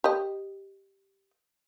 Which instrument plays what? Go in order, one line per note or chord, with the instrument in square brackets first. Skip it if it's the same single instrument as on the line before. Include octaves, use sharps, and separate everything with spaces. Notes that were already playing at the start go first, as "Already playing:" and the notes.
[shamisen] G4 D#5